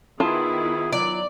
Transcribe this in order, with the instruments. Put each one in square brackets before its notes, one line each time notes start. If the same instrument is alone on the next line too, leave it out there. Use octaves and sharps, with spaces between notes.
[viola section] D#3 B3 E4 [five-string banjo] F4 A5 [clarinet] G#4
[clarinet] F#3 [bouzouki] D5